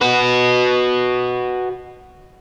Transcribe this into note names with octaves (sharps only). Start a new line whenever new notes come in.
F#4 B4